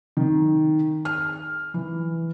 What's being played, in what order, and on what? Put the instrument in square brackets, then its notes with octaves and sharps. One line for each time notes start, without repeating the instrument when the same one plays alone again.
[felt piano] D#3
F6
E3